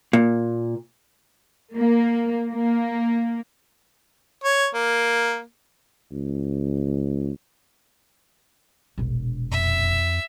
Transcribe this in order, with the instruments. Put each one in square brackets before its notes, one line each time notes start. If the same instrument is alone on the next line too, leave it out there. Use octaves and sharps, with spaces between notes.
[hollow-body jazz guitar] A#2
[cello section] A#3
A#3
[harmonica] C#5
A#3
[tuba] C#2
[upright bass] E1 A#1
[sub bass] F2 [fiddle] E5